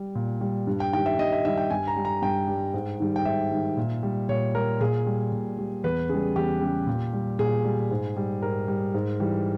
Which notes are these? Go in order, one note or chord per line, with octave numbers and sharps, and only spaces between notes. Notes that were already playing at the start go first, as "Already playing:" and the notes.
Already playing: G3
A#2
G3
G2
G5
D#3 G3 G5
E5
G2 D#5
E5
D#3 G3 E5
G5
G2 G#5
A#5
G3
A#5
G2 G5
G3
G#2
D#3 G3
G5
G#2 E5
D#3 G3
A#2
G3
A#2 C#5
G3 A#4
A#2 G#4
G3
A#2
G3
E2 B4
C#3 G3 G#4
E2 G4
C#3 G3
A#2
G3
A#2 G#4
G3
G#2
G3
G#2 A#4
G3
G#2
E3 G3